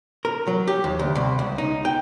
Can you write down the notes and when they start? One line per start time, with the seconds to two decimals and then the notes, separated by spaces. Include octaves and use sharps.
0.25 A#4
0.47 F#3
0.67 G4
0.84 D#2
0.99 D2
1.15 C2
1.39 C#2
1.58 D#4
1.85 G5